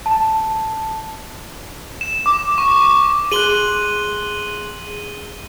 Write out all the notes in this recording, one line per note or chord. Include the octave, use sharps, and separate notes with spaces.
A5
E7
D6
C#6
C#6
G#4 C6 F#6 D#7 F#7 G7